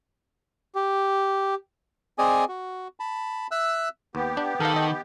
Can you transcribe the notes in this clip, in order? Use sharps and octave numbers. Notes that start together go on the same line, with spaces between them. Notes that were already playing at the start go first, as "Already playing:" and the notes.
G4
C4 G#4 D5 D#5 G#5
F#4
A5 B5
E5 E6 F#6
D#2 B3 G4
D4
D#3 A4 A#4 F5
D#5